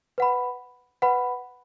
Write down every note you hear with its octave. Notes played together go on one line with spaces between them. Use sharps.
B4 F#5 B5
B4 F#5 B5